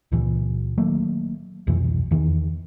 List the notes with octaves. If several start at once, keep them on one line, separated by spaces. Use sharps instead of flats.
C#2 A#2 E3
D#3 F#3 A3 A#3
C2 F2 B2 E3
E2 D#3 E3